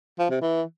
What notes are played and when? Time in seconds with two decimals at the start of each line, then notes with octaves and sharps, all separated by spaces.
0.19 F3
0.30 C3
0.41 E3